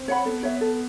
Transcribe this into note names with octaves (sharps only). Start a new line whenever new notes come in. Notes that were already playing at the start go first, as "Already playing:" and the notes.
Already playing: C4
C#5 F#5 B5
B3 A4
B3 C#5 E5
A4